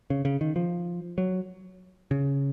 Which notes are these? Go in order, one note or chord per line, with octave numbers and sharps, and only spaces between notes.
C#3
C#3
D#3
F3
F#3
C#3